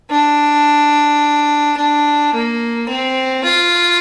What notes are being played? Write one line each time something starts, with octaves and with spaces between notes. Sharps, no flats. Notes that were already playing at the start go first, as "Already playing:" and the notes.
D4
D4
A#3
C4
F4